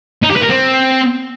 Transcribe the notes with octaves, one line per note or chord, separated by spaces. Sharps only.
D#4
G4
B4
A#4
C4